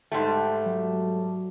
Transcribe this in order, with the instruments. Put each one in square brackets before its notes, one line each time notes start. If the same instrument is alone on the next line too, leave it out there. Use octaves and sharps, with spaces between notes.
[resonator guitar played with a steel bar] G#2 G3 A3 [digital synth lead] G5
[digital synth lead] F#3